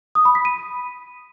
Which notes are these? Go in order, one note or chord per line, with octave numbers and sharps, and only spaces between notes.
D#6
B5
B6
D#7